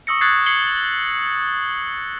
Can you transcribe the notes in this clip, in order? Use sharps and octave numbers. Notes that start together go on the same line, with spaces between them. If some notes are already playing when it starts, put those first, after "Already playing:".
C#6 D#6 E6 A#6 C#7
C#6 D#6 F#6 G#6 A6 C7
G#6 C7 C#7 F#7 G7